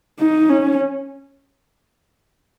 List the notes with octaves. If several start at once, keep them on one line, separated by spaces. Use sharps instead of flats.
D#4
C#4